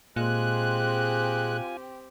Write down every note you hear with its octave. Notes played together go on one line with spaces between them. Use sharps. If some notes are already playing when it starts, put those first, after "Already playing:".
A#2 G#3 C4 F4 G4 G#5 F#6